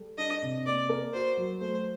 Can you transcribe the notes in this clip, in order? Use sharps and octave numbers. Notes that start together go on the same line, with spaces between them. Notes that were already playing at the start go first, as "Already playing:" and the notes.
Already playing: G3 A4
D4 D#5
C3
A#3 D5
A#4
F#4 C5
F#3
A3 C5